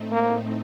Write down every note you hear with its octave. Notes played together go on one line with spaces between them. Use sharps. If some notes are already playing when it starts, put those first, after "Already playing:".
Already playing: A2 A3 C4 D#4
A#3